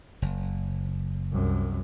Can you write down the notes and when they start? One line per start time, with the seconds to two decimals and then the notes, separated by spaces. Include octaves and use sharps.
0.22 F#1
1.32 C2 F#2